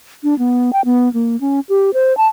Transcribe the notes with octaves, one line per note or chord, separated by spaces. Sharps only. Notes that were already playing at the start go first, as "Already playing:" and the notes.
D4
B3
G5
B3
A#3
C#4
G4
C5
A5